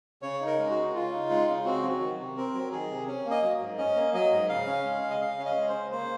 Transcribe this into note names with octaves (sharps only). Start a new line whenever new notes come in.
C#3 C#5
D#4
A#4
G#3
F#4
C#3
C#3 F4
D#4
G#3
C#3
C4 F#4
F#3
F#4
D#3
C3
C4 A#4
F#3
D#3 G#4
C3
C#4
A#3
D#5
F#3
G#2
C#4 D#5
A#3
F#3 D#5
G#2
C#3 F5
C#4
G#3
C#3
D#5
C#3 F5
C#4
D#5
G#3
C5
C#3
A#3 C5